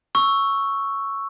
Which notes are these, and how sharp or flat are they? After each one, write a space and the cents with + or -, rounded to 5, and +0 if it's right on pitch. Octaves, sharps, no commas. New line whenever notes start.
C#6 +0 E6 +0